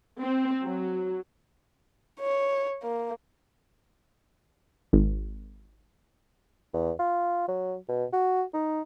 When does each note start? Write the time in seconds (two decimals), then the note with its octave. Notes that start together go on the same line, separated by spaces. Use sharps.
0.22 C4
0.64 F#3
2.20 C#5
2.83 A#3
4.93 G#1
6.74 E2
6.99 F4
7.48 F#3
7.89 B2
8.13 F#4
8.54 D#4